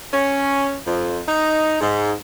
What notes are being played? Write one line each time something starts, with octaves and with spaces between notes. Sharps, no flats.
C#4
F2
D#4
G#2